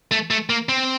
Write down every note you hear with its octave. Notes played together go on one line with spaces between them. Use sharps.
A3
A3
A#3
C4